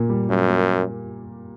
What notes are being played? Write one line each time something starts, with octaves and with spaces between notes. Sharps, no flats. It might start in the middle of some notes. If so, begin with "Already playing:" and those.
Already playing: A#2 A#3
G3
F#2 G3
A#3